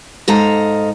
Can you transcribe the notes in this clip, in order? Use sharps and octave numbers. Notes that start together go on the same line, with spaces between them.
G#2 A4 D#5 F5 A#5